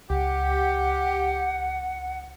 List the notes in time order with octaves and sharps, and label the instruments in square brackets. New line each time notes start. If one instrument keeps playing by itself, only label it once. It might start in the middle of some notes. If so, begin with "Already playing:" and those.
[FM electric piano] C#2 [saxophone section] G4 [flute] F#5